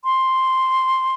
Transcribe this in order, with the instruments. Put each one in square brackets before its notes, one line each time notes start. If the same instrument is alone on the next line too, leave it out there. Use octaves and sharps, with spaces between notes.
[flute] C6